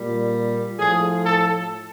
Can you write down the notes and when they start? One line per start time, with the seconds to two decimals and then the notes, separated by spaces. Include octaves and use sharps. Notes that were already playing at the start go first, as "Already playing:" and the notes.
Already playing: A#2 G3
0.79 A2 F3 G#4
1.23 A4